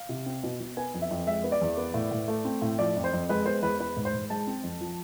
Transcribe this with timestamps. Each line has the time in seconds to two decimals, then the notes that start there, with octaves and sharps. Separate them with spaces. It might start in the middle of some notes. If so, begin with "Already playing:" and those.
Already playing: F5
0.09 C3
0.26 C4
0.43 B2
0.60 B2
0.77 B3 G#5
0.94 F2
1.02 E5
1.11 F2
1.27 G#3 E5
1.44 B3
1.52 D5
1.61 E2
1.77 B3
1.94 A2
2.12 A2
2.28 A3
2.45 C4
2.62 A2
2.79 F3 D5
2.96 F2
3.04 C5
3.13 F2
3.29 G#3 B4
3.46 B3 C5
3.62 E2 B4
3.80 B3 B4
3.97 G#2
4.05 C5
4.13 G#2
4.30 G#3 A5
4.47 C4
4.63 F2
4.81 F3